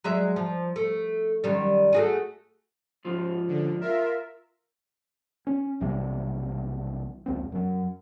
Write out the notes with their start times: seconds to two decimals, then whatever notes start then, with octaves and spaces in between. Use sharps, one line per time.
0.04 F#3 G#3 E5
0.36 F3
0.76 A3
1.44 F#2 D#3 G3
1.93 A3 F#4 G#4
3.05 G#2 F3
3.48 D3
3.81 F4 A#4 E5
5.47 C#4
5.81 B1 C3 E3 G3
7.26 F1 C#2 C4
7.52 F#2 F#3